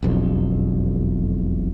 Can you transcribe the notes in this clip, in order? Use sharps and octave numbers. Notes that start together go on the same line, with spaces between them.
E1 B1 F2